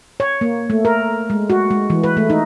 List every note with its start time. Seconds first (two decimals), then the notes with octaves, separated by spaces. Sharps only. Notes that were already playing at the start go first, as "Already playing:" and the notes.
0.20 C#5
0.41 A#3
0.70 A3
0.85 A#4
1.30 G#3
1.50 F#4
1.71 G#3
1.90 E3
2.04 B4
2.17 A3
2.30 D#4